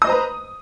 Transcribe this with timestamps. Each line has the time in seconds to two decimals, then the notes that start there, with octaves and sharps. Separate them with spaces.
0.02 D#6
0.04 D#5
0.07 C5
0.10 A#5
0.12 B4